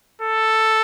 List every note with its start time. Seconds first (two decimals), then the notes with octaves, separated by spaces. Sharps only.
0.21 A4